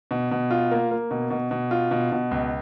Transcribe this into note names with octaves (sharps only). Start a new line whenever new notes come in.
B2
B2
F4
A#3
A#3
B2
B2
B2
F4
B2
B2
C#2